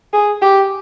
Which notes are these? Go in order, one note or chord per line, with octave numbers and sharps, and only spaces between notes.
G#4
G4